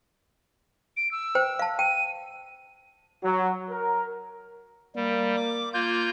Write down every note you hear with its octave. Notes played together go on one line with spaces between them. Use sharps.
D7
E6
C5 G5
F5 A5
G5 D#7
F#3
A#4
G3 A#3
D6
A#3 F4 G6